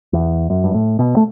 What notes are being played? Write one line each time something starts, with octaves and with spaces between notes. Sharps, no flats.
E2
F#2
G2
A2
B2
A3